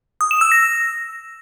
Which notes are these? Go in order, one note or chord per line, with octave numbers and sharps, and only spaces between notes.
D#6
E7
E6
A#6